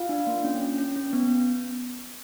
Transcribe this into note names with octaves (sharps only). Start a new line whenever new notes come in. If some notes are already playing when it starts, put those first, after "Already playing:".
Already playing: F4 F5
D4
A#3
C#4
C#4
C#4
C#4
B3